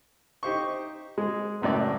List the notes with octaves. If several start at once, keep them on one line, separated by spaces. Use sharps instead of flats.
D#4 G4 C5 C#6
G#3
C#2 F#2 A2 D5